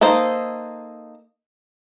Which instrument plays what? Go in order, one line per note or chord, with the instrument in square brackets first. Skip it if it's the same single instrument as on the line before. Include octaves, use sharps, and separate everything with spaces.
[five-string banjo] A#3 D#4 A4 C5